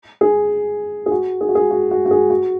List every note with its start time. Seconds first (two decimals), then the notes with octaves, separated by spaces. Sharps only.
0.21 G#4
1.06 G#4
1.11 F#4
1.41 G#4
1.49 F#4
1.55 G#4
1.71 F#4
1.91 F#4
2.06 F#4
2.11 G#4
2.30 F#4